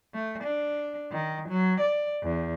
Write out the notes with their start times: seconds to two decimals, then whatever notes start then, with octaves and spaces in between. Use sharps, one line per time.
0.14 A3
0.44 D4
1.12 D#3
1.49 F#3
1.81 D5
2.23 E2